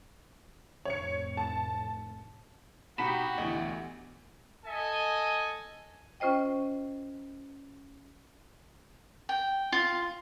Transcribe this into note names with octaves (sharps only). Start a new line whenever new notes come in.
F1 A2 C#5 C#7
A5
B2 D#4 F#4 G4 F#5 B5 B6 E7
D2 B2 E3 D#5
A4 D#5 G#5
C#4 F4 C5 D#5 G5
G5
F4